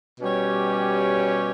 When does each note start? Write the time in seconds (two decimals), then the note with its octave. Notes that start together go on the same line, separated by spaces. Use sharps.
0.21 B2 G3 C#4 G4 C#5